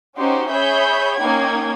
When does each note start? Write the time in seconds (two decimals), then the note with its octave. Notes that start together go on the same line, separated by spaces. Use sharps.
0.17 C#4 D#4 F#4 G4 C5 C6
0.52 G#4 C#5 E5 B5 G6
1.19 A#3 C#4 D#4 G5 G#6